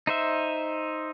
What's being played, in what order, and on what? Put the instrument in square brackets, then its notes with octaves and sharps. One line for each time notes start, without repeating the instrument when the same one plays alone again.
[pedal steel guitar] D#4 C5 E5